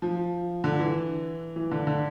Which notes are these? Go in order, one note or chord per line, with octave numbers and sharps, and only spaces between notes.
F3
D3
E3
E3
D3
D3